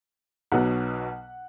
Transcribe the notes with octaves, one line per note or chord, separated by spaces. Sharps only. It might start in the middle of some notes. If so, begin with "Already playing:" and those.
B1 B2 F#3 B3 F#5